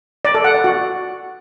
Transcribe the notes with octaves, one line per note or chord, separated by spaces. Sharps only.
D5
A4
F#5
D5
F#4